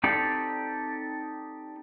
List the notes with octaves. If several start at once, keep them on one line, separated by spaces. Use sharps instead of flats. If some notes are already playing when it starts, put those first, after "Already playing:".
C4 D#4 G4 A4 D5